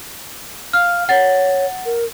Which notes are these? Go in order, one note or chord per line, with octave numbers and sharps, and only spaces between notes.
F5 F6
C#5 F#5 A6
A#4